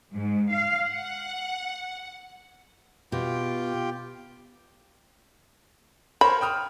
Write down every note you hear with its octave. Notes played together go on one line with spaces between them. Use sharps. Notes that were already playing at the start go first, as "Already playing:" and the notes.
G#2
F5
F#5
B2 F4 G4 G5
A#4 C5 C#5 B5
G5 D#6 F6